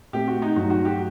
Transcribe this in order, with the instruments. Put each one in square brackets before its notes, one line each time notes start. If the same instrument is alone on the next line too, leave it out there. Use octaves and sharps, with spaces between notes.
[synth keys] A#2 A3 C4 [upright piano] G4
[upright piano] F#4
D#4
[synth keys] G2 F#3 A3 D#4 [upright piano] F#4
[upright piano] F#4
G4